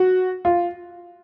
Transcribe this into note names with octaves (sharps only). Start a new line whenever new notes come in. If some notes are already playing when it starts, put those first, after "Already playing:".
Already playing: F#4
F4